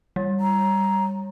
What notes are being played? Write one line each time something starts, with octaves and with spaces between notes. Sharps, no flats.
G3
A#5